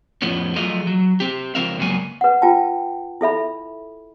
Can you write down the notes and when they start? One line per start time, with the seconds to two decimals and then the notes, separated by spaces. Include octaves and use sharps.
0.22 F2 A2 F3 B3 C#4
0.55 F3 F#3 A3 G#4 D#5 F5
0.87 F#3
1.20 C4 G4
1.55 C#2 F3 C4 A#4 E5 F5
1.78 C#2 G2 F#3 A#3 B3 G#5
2.21 B4 F#5
2.42 F4 G5 A5
3.21 E4 A4 E5 B5